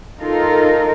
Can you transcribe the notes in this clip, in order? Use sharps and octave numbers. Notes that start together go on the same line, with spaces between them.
D#4 F4 A4 A#4